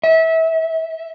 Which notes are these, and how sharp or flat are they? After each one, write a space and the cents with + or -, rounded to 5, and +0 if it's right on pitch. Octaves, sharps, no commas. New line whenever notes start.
E5 -25